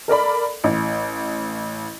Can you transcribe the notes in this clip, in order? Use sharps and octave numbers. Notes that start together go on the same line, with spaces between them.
A4 A#4 D5 B5
A1